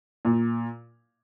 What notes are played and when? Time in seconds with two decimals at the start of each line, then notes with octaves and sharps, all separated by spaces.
0.25 A#2